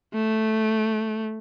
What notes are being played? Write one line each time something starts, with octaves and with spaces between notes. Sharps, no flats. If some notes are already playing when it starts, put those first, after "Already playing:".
A3